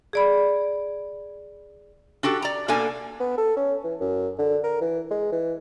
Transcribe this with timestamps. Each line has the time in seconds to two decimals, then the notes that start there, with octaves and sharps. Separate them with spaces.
0.13 G#4 D5 B5
2.23 D4 F#4 G4 A4
2.42 D5 A#5
2.68 B2 A#3 D4 A4 F5 G#5
3.20 B3
3.38 A4
3.57 C#4
3.84 E3
4.00 F#2
4.38 D3
4.64 A#4
4.81 E3
5.11 G#3
5.32 E3